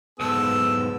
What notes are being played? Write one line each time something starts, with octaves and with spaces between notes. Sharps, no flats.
B1 G#2 B3 A4 E6